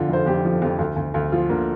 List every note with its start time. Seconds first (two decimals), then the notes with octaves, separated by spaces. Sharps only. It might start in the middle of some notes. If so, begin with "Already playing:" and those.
Already playing: F2 D3 F4
0.09 F1 C5
0.26 F2 G4
0.45 F3
0.62 F2
0.79 D2
0.96 D2
1.14 D2
1.32 F3 F4
1.49 D3 A#3